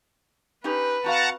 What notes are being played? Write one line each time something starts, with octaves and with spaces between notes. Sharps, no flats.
C#4 D#4 G4 B4
C4 F#4 F5 F#5 A5 A#5